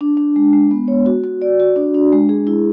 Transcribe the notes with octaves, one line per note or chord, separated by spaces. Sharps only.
D4
D4
G#3
G#3
B3
C#5
F#4
F#4
D5
F#4
D4
D4
G#3
G#4
E4